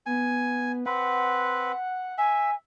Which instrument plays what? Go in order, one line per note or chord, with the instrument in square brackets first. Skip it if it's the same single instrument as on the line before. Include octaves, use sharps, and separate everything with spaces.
[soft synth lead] B3 [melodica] G#5
[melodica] C4 B4 [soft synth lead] F#5
[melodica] E5 [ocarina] G#5